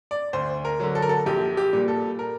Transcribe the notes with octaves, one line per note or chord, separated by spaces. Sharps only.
D5
D2 C5
A#4
D3 F#3
A4
A#4
A4
A#1 G4
G4
A#2 G3
A4
A#4